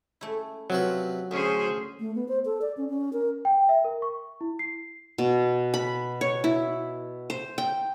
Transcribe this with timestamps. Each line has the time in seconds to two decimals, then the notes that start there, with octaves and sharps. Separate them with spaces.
0.21 A3 C#4 E4
0.70 C3 F3 F#3 B4
1.31 D2 C#4 G#4 C5 E5
2.00 A3
2.15 B3
2.28 C5
2.45 A4
2.62 D5
2.77 C#4
2.89 C#4
3.13 A#4
3.45 G5
3.69 E5
3.84 A#4
4.02 C#6
4.41 E4
4.59 C7
5.18 B2
5.74 B5
6.21 C#5
6.44 E4
7.30 C5
7.58 G5